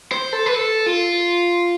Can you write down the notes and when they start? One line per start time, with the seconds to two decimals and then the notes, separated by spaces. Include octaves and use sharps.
0.12 C5
0.33 A4
0.46 B4
0.54 A4
0.86 F4